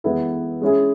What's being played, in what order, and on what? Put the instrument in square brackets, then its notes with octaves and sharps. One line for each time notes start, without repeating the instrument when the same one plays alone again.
[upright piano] E3 G#3 B3 E4 A4
G#3 C#4 E4 G#4